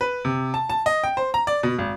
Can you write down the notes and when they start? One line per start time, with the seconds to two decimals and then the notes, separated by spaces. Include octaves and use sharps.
0.01 B4
0.25 C3
0.54 A5
0.70 A5
0.86 D#5
1.04 G5
1.17 C5
1.34 A#5
1.47 D5
1.63 B2
1.78 G#1